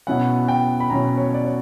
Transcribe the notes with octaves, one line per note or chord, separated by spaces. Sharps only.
B2 F#3 C#4 E4 F#5
G5
B5
B2 F#3 C#4 E4 A#5
C#5
D5
C#5